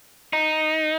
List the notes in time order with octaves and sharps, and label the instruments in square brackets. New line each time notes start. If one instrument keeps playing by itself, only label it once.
[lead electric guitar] D#4